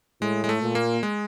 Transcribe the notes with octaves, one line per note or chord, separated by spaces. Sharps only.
A2 G#3
G#3
A3
A#2
A#3
G#3